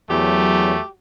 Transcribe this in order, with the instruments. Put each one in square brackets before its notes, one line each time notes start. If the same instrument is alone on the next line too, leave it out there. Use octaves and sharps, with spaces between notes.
[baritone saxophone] E2 [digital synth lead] F#3 [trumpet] A3 [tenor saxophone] G4